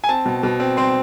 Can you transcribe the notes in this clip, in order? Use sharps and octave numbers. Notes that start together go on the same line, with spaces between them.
G#5
C4 A5
B2
B2
C4
C4 C6